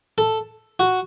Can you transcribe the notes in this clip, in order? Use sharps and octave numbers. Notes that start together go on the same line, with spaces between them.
A4
F#4